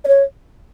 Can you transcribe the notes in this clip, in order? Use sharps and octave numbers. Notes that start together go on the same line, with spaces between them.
D5
C#5